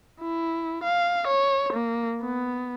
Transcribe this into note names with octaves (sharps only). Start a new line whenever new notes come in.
E4
F5
C#5
A#3
B3